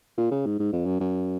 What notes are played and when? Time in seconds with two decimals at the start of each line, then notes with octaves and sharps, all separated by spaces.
0.18 A#2
0.31 C#3
0.46 G#2
0.59 G#2
0.73 F2
0.85 F#2
1.00 F#2